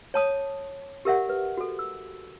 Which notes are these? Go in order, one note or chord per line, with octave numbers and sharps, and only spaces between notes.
C#5 A5 D#6
G4 A#4 E5 F#5
B4
F#4 A4
E6